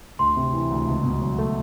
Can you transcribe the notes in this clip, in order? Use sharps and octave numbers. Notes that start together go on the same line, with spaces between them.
D2 C6
C3
E3
D2
C#2
B2
F#3
A3